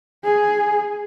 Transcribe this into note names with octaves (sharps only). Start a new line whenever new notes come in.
G#4